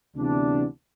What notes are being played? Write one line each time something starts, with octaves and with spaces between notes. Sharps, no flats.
D2 C3 E3 B3 D4